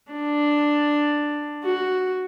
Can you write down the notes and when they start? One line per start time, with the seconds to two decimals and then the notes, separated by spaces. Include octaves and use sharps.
0.12 D4
1.65 F#4